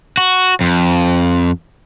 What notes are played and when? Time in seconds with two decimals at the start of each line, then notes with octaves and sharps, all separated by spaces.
0.17 F#4
0.61 F2